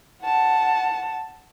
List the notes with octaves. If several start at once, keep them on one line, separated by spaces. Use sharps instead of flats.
F#5 A5